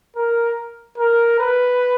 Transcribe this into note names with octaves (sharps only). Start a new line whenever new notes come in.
A#4
A#4
B4